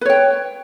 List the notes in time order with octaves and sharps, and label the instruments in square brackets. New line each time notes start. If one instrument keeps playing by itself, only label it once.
[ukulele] B4
C#5
G5